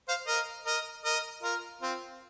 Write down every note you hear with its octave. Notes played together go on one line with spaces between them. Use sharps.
C5 F5
A#4 D#5
A#4 D#5
A#4 D#5
F4 A#4
C4 F4